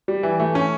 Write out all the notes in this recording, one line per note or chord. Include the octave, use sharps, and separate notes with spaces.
G3
E3
A3
C#4